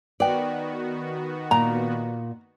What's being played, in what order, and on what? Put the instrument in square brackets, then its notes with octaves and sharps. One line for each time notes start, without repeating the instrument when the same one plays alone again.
[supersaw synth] D#3 B3 F#4 [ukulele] B4 G5 [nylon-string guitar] D5
[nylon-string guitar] A#2 [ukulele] A#5